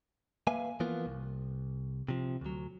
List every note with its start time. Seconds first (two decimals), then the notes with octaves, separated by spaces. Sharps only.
0.47 A#3 B4 E5 F5 G#5
0.80 E3 F3 A#3 B3 F4
1.06 C2
2.09 C3 F3
2.41 D2 F#3